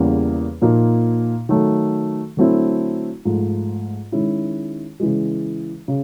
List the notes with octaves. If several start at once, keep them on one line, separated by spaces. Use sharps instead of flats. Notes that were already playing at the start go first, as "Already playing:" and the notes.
Already playing: E2 C#3 E3 G3 A#3
A#2 F3 A#3 D#4
D#3 F#3 A3
D3 F#3 A3 C4 E4
G#2 F3 A3
D#3 G#3 C#4 E4
C#3 E3 G#3
C#3